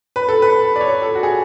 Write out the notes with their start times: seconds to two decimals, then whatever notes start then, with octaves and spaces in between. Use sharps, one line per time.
0.16 B4
0.28 A4
0.42 B4
0.76 D5
0.81 C#5
1.02 A4
1.15 F#4
1.23 G#4